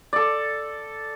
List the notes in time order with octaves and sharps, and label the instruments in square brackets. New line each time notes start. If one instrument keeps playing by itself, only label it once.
[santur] A4 D5